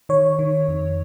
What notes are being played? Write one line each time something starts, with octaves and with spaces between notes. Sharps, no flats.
D#3 C#5
D#3
F2